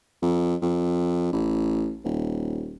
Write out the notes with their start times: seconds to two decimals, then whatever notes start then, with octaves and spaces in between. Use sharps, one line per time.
0.22 F2
0.62 F2
1.33 A1
2.04 D#1